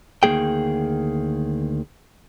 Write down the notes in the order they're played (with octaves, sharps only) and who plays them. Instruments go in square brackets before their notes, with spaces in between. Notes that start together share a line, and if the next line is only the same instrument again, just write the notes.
[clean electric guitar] D2 D#3 F#3 A#3 G#4 G5